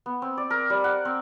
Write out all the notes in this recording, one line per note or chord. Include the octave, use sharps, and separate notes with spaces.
B3
C4
D5
A#4
G3
F#5
C4